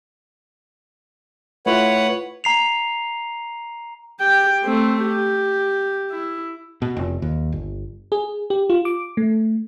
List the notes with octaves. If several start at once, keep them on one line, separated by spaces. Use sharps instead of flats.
A3 E4 F4 B4 C#5 F#5
A#5 C7 F7
G4 G5
A3 C4
G4
E4
B2
F1
D#2
G1
G#4
G4
F4
D6
A3